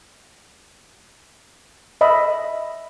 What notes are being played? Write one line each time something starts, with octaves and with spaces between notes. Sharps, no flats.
D#5 E5 B5